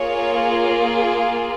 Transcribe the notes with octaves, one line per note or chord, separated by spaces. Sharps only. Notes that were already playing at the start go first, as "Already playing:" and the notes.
Already playing: A#3 F4 G#4 C#5